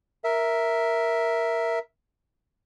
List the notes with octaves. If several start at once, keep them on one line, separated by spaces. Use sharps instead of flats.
A#4 E5